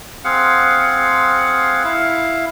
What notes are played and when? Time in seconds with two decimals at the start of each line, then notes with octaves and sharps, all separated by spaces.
0.24 C4 G#4 F5 F#5
1.84 E4 F5